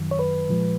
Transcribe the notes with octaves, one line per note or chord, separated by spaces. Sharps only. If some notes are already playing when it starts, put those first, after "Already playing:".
Already playing: F#2 D#3 F#3
C#5
B4
A#2 F3 G#3